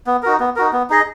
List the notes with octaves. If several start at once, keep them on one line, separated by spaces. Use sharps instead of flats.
B3
D#4 F#4 A#4
B3
D#4 F#4 A#4
B3
D#4 G#4 D#5